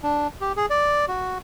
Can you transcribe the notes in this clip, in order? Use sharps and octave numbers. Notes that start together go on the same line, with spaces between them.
D4
G4
G#4
D5
F#4